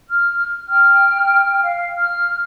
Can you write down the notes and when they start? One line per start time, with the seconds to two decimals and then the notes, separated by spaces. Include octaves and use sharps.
0.08 F6
0.69 G5 F6
1.62 F5
1.96 F6